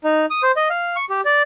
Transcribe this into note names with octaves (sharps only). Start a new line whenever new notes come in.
D#4
D#6
C5
D#5
F5
C#6
G4
D5